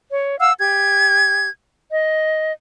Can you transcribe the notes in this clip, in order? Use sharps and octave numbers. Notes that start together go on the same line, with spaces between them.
C#5
F5 F#5 E6
G4 G#6
D#5